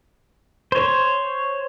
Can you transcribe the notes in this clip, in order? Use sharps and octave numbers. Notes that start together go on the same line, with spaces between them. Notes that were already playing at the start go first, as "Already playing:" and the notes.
C5 C#5